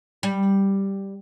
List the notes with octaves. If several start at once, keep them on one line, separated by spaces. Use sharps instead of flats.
G3